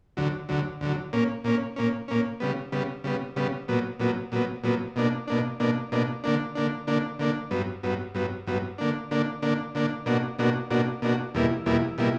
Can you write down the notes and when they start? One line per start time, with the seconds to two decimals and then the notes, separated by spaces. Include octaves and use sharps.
0.17 D2 D3 F#3
0.49 D2 D3 F#3
0.81 D2 D3 F#3
1.13 A#2 A#3 C#4
1.44 A#2 A#3 C#4
1.76 A#2 A#3 C#4
2.08 A#2 A#3 C#4
2.40 C#3 G3 B3
2.72 C#3 G3 B3
3.04 C#3 G3 B3
3.36 C#3 G3 B3
3.68 A#2 F#3 B3
3.99 A#2 F#3 B3
4.32 A#2 F#3 B3
4.63 A#2 F#3 B3
4.96 B2 A#3 D4
5.28 B2 A#3 D4
5.60 B2 A#3 D4
5.92 B2 A#3 D4
6.24 D3 A#3 D4
6.55 D3 A#3 D4
6.87 D3 A#3 D4
7.19 D3 A#3 D4
7.51 G2 F#3 B3
7.83 G2 F#3 B3
8.15 G2 F#3 B3
8.47 G2 F#3 B3
8.78 D3 A#3 D4
9.11 D3 A#3 D4
9.42 D3 A#3 D4
9.75 D3 A#3 D4
10.06 B2 A#3 D4 F#4
10.39 B2 A#3 D4 F#4
10.71 B2 A#3 D4 F#4
11.02 B2 A#3 D4 F#4
11.34 E2 B2 G3 A#3 E4
11.66 E2 B2 G3 A#3 E4
11.98 B2 G3 A#3 E4